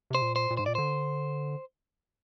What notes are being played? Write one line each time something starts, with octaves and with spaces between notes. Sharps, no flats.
C3 C5
A#2
C5
A#2
G#2 C5
A#2 D5
D3 C5